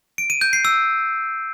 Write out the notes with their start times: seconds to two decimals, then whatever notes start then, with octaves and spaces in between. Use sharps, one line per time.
0.18 D7
0.30 D#7
0.41 G6
0.53 C7
0.65 E6